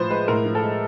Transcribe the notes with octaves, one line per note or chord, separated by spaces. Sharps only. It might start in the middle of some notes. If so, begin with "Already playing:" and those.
Already playing: A2 F3 B4 C5
G#3 B4
A2 A#4
F3
A4
G#3